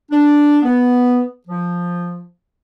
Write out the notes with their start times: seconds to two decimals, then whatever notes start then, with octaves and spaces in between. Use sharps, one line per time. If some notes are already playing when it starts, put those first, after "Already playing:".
0.10 D4
0.63 B3
1.48 F3